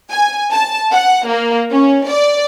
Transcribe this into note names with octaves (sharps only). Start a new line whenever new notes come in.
G#5
A5
F#5
A#3
C#4
D5